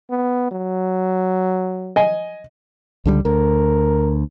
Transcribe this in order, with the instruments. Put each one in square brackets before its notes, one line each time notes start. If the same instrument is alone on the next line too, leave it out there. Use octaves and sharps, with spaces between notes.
[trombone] B3
F#3
[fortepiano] D#5 G#5
[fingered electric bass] C#2 D3 G3
[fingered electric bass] D2 [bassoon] A#4